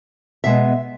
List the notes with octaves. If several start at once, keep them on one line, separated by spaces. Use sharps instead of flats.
B2 G#3 B3 E5